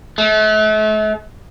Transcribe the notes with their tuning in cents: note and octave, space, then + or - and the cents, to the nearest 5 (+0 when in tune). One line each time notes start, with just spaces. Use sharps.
A3 -40